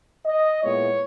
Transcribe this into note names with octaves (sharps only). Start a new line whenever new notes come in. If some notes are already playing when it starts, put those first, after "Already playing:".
D#5
A#2 G#3 B3 E4 C#5